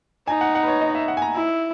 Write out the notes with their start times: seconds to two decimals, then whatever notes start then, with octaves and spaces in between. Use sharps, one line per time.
0.27 D#4 G#5
0.41 F#5
0.55 F#5
0.63 B4
0.68 C#5
0.81 D#5
0.95 E5
1.08 F#5
1.17 G#5
1.22 A#5
1.35 E4